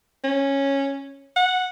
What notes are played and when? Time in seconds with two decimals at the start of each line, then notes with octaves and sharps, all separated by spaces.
0.24 C#4
1.36 F#5